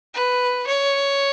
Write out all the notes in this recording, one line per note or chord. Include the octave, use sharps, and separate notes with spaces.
B4
C#5